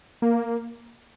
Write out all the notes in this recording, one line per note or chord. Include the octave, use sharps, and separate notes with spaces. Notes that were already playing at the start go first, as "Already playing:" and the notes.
A#3